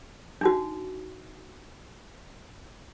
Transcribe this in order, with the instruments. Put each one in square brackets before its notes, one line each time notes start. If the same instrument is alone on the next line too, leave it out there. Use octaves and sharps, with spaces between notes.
[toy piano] D4 D#4 F#4